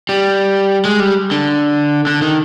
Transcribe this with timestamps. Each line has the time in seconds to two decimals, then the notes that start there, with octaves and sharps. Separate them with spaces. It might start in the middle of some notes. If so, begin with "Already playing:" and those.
0.09 G3
0.85 G#3
1.00 G3
1.31 D3
2.07 D3
2.22 D#3